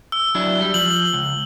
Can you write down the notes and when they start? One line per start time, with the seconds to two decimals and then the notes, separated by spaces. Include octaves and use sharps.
0.12 E6
0.35 F#3 D4 E4
0.61 G3
0.74 F3 F#7
1.13 C#2